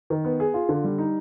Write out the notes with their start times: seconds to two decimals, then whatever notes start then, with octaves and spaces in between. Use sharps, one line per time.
0.10 D#3
0.25 B3
0.40 G#4
0.54 F4
0.69 D3
0.84 G3
0.98 D#4